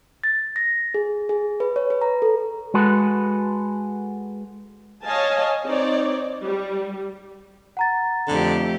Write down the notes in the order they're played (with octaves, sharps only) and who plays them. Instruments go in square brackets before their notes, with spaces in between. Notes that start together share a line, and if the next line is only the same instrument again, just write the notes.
[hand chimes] A6
A#6
G#4
G#4
B4
C#5
B4
A#5
A4
[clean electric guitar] G#3 F#4 A4 B4
[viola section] C#5 D#5 F5 G#5 A5
C4 D#4 C#5 D5
G3
[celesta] F#5 A#5 A6
[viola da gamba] F2 A3 G4 [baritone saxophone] D3